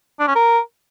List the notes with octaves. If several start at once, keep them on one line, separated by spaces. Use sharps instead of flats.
D4
C#4
A#4